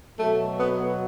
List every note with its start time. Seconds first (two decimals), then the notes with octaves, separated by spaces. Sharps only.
0.19 B2 F#3 A3
0.57 B3